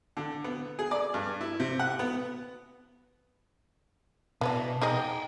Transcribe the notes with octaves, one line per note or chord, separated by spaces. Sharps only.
D3
B3
G#4
D5
G2
E4
C3
F#5
B3
B2 E3 B3 D4
D#4 G#4 D#5 F#5 G5